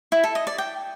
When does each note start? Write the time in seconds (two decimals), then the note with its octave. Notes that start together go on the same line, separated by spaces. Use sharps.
0.12 E4
0.24 A4
0.35 D#5
0.47 D5
0.58 G5